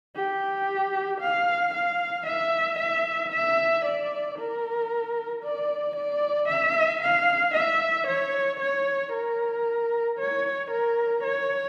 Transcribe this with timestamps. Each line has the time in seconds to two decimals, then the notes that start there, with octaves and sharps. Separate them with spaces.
0.16 G4
1.21 F5
1.74 F5
2.27 E5
2.79 E5
3.32 E5
3.85 D5
4.38 A#4
5.43 D5
5.96 D5
6.49 E5
7.02 F5
7.55 E5
8.07 C#5
8.60 C#5
9.13 A#4
10.19 C#5
10.71 A#4
11.24 C#5